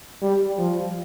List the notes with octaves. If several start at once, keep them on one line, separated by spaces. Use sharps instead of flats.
G3
F3